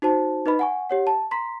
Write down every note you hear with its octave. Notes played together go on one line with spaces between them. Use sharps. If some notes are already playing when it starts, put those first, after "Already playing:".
D#4 F#4 C5 A5
D#4 B4 D#5 B5
F#5 G#5 C#6
G4 C#5 F#5
A5
A#5 C6 B6